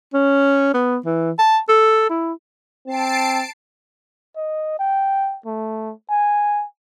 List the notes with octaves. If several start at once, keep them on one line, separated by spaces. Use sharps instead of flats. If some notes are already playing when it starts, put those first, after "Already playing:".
C#4
B3
E3
A5
A4
E4
C4 A5 C7 D7
D#5
G5
A3
G#5